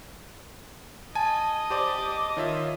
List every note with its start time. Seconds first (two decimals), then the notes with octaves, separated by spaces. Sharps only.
1.15 D#5 G#5 A5
1.70 G4 C5 D5 D6
2.37 D#3 F4 C#5 E5